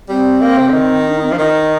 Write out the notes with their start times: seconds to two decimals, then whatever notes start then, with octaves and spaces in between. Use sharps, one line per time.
0.09 G3 C4
0.41 A#3
0.58 C3
0.69 D3
0.74 D#3
1.06 D4
1.15 D#4
1.22 C4
1.30 F3 D4
1.38 D#3 D#4